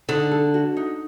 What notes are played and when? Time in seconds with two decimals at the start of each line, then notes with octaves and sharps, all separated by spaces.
0.09 D3 D#4
0.31 A4
0.54 F#4
0.77 D#4